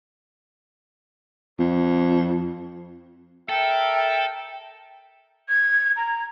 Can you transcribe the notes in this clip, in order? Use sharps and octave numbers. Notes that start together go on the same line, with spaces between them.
F2
A4 A#4 E5 G5
G#6
A#5